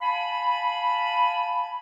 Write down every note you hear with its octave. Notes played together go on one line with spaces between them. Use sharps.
F5 G#5 A5 B5